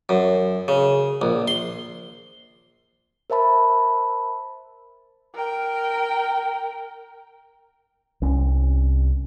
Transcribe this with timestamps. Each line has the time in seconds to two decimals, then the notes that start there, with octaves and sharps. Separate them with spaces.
0.09 F#2
0.68 C#3
1.22 A#1
1.48 C6
3.30 A#4 C5 E5 A5 B5
5.35 A#4 G5
8.22 C2 C#4